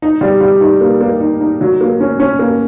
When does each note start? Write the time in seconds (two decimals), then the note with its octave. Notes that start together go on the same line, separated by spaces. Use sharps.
0.02 D#4
0.21 G3
0.41 G3
0.61 D#4
0.81 A#3
1.01 A#3
1.21 D#4
1.41 D#4
1.61 F#3
1.81 A#3
2.01 C#4
2.20 C#4
2.39 A#3